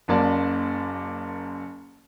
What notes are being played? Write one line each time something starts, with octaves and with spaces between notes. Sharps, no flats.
F#1 F#2 A#3 D5 A5